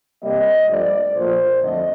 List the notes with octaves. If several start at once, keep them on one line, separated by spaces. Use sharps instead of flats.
C3 G3 A#3 D#5
G2 F3 A3 D5
A#2 F3 A3 C5
F2 D3 F3 A3 D#5